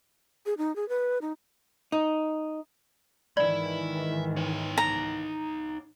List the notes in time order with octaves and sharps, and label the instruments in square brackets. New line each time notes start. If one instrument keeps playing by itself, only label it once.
[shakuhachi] G#4
D#4
G#4
B4
D#4
[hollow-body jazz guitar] D#4
[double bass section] G#2 D#3 E3 [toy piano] D5 [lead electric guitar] E5 B5
[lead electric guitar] D#4 C#5
[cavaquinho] A#5